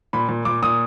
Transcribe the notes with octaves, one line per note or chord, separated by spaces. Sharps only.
A#2 B5
A#2
A#2 D6
A#2 D#6